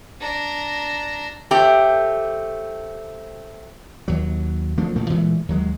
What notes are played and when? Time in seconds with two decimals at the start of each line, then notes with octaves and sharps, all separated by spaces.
0.20 D4 A#5
1.51 A3 C4 G4
4.08 D#2 F#3
4.78 F3 A3 A#3 D4
4.96 A1 A#2 A3 A#3
5.10 A#2 E3 G#3 A3
5.49 D#2 F#3 G#3